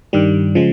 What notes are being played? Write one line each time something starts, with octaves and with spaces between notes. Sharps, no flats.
G2 D#3 G3
C#3 F3 G#3